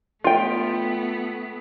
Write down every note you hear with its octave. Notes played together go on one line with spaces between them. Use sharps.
A3 B3 F4 G5